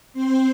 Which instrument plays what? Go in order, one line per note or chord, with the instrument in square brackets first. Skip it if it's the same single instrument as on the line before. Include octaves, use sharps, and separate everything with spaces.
[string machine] C4 C5